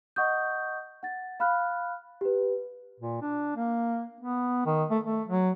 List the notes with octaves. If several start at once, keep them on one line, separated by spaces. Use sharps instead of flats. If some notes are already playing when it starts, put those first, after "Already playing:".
D#5 F#5 C#6 D#6 G6
F#5 A6
F5 B5 F6 F#6
G4 B4
A#2
D4
A#3
B3
D#3
A3
A3
F#3